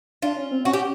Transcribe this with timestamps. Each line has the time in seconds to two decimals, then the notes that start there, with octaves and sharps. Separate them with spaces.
0.22 D4 F4
0.37 C#4
0.51 C4
0.65 C#4 F#4
0.73 G4